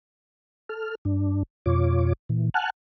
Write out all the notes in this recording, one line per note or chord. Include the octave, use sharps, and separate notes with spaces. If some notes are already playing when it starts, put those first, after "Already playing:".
A4 F6
G2 D4
F2 B2 F4 C#5 D6
A#2 E3
F#5 G#5 A5 F6 F#6